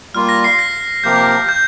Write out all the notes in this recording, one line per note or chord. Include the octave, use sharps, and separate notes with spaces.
G3 A#3 F4 F6
A#6
C7
A#6
C3 F3 A#3 G4 A#4 G6
G6